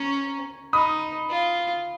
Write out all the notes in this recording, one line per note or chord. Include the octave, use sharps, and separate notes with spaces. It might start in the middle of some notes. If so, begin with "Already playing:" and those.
Already playing: C#4 A#5 C#6
D#4 B5 D#6
F4